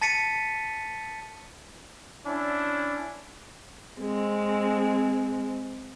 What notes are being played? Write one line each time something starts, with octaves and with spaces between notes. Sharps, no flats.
A5 A6 B6 C#7 D#7
C#4 D4 E4
G#3 C4